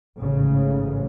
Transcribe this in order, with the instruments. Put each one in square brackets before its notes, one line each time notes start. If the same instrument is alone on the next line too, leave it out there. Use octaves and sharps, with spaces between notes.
[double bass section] A1 G#2 C#3